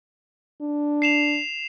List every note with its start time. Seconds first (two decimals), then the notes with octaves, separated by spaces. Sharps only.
0.61 D4
1.02 C7 E7 F7